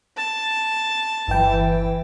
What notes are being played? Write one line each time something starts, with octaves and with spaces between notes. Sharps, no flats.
A5
G1 E3 G5